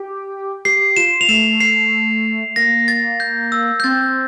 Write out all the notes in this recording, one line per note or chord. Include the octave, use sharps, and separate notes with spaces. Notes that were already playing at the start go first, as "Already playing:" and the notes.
Already playing: G4
G4 C7
F4 E7
F7
A3 E7
C7
A#3 A#6
A6
G6
E6
G6
C4 A6